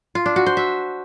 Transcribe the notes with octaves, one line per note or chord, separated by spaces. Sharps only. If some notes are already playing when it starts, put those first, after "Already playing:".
F4
D4
F#4
C5
E5